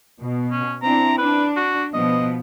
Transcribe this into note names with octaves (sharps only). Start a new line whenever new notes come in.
B2
C#4
C4 D4 E4 A#5
D4 B4
F#4
B2 F3 B3 D#5